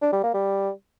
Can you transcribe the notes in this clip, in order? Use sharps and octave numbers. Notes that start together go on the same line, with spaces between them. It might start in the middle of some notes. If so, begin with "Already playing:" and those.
D4
G3
A#3
G3